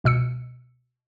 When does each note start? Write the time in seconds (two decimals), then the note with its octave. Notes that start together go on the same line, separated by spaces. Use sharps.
0.04 C#2 B2 E6 C#7